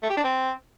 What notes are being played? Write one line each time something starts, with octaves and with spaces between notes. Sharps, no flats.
A3
G4
D4
C4